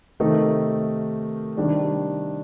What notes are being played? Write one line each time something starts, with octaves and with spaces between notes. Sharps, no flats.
C3 D#3 A3 D#4 A#4
C3 D#3 G3 D4